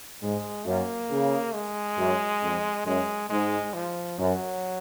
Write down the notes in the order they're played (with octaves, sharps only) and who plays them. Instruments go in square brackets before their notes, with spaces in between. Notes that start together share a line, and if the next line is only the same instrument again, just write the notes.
[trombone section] G#2 [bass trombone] G#3
[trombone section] F#2 [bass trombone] A#3
[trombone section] C#3
[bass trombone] G#3
[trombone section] F#2
F2
[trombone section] F#2 [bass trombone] G#3
[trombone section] G#2 [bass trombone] G#3
[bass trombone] F3
[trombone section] F#2 [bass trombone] F#3